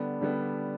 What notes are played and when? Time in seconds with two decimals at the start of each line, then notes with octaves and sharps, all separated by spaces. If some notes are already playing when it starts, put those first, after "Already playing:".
Already playing: D3 G3 B3 D4
0.21 D3 G3 B3 D4